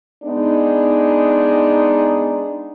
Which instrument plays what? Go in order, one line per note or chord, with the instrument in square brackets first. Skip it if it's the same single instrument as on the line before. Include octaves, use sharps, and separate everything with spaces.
[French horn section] G#3 B3 D4 D#4